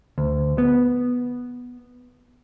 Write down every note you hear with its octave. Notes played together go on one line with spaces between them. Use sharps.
D2
B3